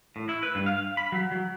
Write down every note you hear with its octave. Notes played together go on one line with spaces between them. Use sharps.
A2
E4
B4
G2
F5
B5
F#3
F#3